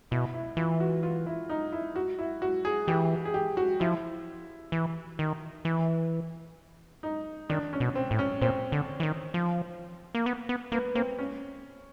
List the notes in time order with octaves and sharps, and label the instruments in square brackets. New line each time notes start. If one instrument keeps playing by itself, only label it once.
[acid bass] B2 [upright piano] E4
[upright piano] E4
[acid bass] E3 [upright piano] F4
[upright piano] F#4
F4
E4
D#4
E4
F#4
E4
F#4
G#4
[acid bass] E3 [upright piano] G4
[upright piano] G#4
G4
F#4
[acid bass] F3 [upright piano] E4
[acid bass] E3
D#3
E3
[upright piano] D#4
[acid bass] D#3 [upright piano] D4
[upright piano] C#4
[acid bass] B2
[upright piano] C4
[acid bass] A2
[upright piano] C#4
[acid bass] A#2 [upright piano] C4
[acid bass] D3
E3
D#3
F3
A#3
B3
B3
[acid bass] A#3 [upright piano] B3
[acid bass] A#3 [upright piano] C4
[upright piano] C#4